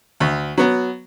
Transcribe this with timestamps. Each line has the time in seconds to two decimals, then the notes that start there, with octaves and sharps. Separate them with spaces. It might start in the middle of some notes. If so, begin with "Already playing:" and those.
0.20 D2
0.58 F#3 B3